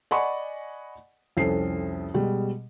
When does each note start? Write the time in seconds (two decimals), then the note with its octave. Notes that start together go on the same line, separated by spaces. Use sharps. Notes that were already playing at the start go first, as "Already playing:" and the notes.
0.11 D5 D#5 F#5 G#5 B5 C#6
1.37 C2 F2 C#4 A4 C7
2.14 B2 G3 G#3